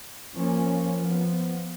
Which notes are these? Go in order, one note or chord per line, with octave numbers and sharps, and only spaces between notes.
F3 A#3 C#4
F3 B3